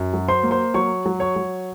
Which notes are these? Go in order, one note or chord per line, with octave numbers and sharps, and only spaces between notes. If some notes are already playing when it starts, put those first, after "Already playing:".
Already playing: F#2
F#3
C5 C6
A#3
C5 C6
F#3 C#5 C#6
F#3
C#5 C#6
F#3